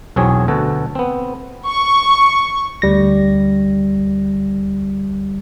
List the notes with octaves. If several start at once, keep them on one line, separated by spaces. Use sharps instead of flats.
B1 E2 F#3 C4 G#4 C#5
D2 B2 F#4 A4
B3 C4
C#6
D2 G3 A#6